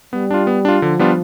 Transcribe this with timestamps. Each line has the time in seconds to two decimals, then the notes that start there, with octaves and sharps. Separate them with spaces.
0.13 G3 B3
0.31 D4 F4
0.47 B3
0.65 D4 F4
0.82 D3 F3
0.99 G3 B3 D4 F4